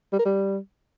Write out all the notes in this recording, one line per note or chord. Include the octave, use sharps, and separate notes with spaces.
G3
A#4
G3